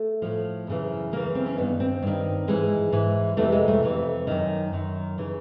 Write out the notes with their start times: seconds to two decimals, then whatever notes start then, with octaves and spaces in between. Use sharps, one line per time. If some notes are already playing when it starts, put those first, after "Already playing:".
Already playing: A3
0.22 A2 F3
0.67 F#2 C#3 E3
1.12 F#2 C#3 E3 A#3
1.35 C4
1.46 C#4
1.57 G2 D#3 B3
1.80 C4
2.02 G2 D#3
2.47 G#2 E3 G#3
2.92 G#2 E3
3.37 F2 C3 E3 A3
3.52 G#3
3.68 A3
3.83 F2 C3 E3
4.27 F#2 D#3
4.73 F#2 D#3
5.18 C#3 E3